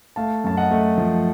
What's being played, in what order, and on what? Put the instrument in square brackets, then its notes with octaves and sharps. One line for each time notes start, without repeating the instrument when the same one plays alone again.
[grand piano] A3 F5 A5
F#2 A5
D#5 F#5
A3
F3